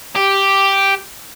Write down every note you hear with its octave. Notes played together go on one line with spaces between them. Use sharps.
G4